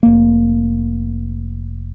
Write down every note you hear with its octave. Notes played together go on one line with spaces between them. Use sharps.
F1 A#3